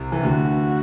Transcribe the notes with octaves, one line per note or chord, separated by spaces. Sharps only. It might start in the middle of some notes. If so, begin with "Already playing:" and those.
Already playing: C2 C3
E3
D2 D3 F#4